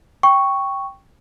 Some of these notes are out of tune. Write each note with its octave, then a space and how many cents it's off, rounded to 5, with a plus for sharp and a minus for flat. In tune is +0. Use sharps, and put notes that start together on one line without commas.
G5 +0 C#6 +0